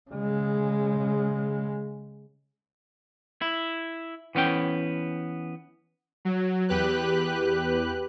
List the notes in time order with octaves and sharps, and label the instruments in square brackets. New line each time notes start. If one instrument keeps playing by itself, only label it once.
[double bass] C#3 G#3
[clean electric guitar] E4
E3 B3 C#4 G5
[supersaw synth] F#3
E2 G4 B4 F#6